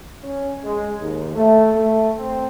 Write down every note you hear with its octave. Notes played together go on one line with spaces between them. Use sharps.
C#4
G#3
D#2
A3
A3
C4